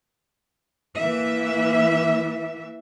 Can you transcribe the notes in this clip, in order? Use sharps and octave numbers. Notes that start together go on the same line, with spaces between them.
E3 A#3 E5